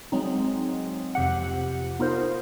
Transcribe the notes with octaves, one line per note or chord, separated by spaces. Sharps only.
F#3 G#3 C4 D#4
F2 C3 G4 F#5
B3 D#4 F4 A#4 C5